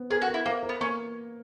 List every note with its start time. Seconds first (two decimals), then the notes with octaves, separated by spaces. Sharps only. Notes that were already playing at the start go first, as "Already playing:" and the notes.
Already playing: B3
0.10 G#4 A#4
0.22 F#4
0.28 A#4
0.34 E4
0.46 A#3 A#4
0.63 A#4
0.69 B3
0.81 A#3 C#4